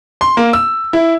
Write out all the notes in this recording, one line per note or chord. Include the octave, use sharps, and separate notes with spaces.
C6
A#3
E6
E4